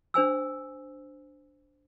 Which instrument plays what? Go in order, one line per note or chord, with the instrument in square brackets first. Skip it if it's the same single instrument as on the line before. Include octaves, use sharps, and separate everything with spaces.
[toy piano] D4 C5 G#5 E6